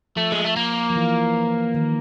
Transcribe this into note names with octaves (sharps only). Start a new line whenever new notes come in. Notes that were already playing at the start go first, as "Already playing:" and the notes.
F3 A3
G#3
A3
A#3
F3
E3
D#3